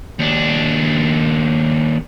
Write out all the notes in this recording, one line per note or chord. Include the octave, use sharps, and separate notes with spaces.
D#2 D4